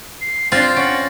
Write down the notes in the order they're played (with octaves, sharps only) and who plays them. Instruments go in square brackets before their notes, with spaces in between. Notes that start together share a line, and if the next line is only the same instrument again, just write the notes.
[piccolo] C7
[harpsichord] C4 [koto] D4 F4 [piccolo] C6 [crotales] A6 A#6 C7
[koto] C#4 [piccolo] F#5 [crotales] D7